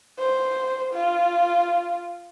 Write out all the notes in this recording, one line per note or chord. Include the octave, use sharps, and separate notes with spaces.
C5
F4